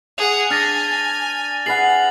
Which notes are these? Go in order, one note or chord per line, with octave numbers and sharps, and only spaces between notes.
G#4 F#5 F7
D4 G#5 F6 A6 A#6
A6
G#4 B4 F#5 A6 C7 F#7